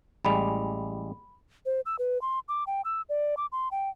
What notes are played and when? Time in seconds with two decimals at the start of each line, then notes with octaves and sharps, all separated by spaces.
0.25 A1 G3 G#3 B5 F7
1.66 C5
1.86 E6
1.99 B4
2.22 C6
2.48 D6
2.67 G5
2.85 E6
3.09 D5
3.37 D6
3.52 C6
3.71 G5